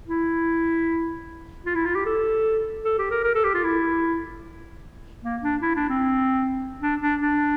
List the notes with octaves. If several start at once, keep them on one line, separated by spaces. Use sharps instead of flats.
E4
F4
E4
F4
G4
A4
A4
G4
A#4
A#4
A4
G4
F4
E4
A#3
D4
E4
D4
C4
D4
D4
D4